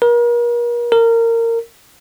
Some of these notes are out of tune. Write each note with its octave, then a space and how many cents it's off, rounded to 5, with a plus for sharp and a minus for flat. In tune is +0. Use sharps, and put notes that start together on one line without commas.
A#4 +40
A#4 -20